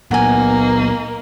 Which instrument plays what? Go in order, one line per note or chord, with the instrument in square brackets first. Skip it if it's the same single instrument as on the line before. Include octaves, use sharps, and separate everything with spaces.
[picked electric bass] A#2 F#3 [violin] A#3 D#4 [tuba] B3 [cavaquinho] F#5 G#5